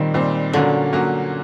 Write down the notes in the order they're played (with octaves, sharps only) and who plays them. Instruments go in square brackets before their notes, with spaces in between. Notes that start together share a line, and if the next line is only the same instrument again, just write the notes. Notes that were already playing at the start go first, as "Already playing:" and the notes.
Already playing: [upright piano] A#2 G3 C4 [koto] D#3
[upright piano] A#2 G3 C4
[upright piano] A#2 F#3 A#3 C#4 F#4 [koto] D3
[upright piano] A#2 F#3 A#3 C#4 F#4